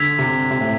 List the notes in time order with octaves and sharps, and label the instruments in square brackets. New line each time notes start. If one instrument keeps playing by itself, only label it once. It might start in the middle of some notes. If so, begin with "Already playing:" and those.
Already playing: [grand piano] D3 [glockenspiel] E6 G#6 B6 F7
[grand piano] C3
C3
A2